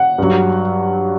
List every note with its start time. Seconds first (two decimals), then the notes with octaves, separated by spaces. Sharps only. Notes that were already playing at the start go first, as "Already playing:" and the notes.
Already playing: F#5
0.18 G2 F#3